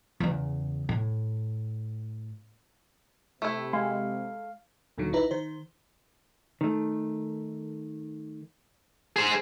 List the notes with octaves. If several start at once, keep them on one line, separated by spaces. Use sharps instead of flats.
E2 C#3
A2
C3 A3 E4
G#3 F5
D2 A#2 D3 D#3 F#3
A#1 D#4 E4 B4 A#5
D#3 C5
D#3 A3
G#4 C5